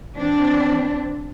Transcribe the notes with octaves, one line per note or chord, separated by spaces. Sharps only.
E3 C4 D4